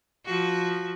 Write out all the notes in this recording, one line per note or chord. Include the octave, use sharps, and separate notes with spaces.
F3 F#4